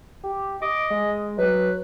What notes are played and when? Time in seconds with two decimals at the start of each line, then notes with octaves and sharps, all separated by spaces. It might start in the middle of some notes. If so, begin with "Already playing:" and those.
0.24 G4
0.62 D#5 D6
0.91 G#3
1.38 F#3 B4